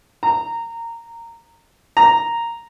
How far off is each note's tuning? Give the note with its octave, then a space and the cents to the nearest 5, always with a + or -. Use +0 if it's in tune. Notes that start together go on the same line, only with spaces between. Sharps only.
A#5 -15
A#5 -5